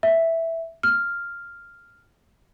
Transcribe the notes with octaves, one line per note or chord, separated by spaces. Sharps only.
E5
F6